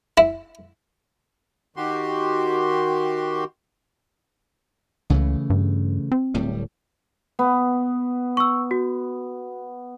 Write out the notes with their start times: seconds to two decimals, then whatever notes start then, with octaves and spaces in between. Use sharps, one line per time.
0.18 E4
1.76 D#3 F#4 G4 C6
5.10 C#2 C#3 E3 A3
5.50 G2
6.12 C4
6.34 D1 A2 G3
7.39 B3
8.37 C#6 E6
8.71 F#4